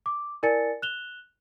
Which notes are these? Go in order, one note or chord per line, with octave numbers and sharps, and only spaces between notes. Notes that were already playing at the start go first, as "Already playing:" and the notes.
D6
E4 A#4 D5 G#5 A6 C#7
F#6 E7 F7 G7